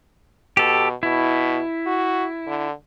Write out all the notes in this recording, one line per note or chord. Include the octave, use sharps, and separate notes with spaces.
B2 G4 A4
B2 E4
F#4
D3